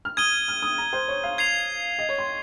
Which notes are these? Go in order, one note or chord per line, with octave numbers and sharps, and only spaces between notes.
F6
D#6 G#6 D#7 G7
F6
D#6
A#5
C5
C#5
F5
G#6 C7 F7
D#5
C#5
C6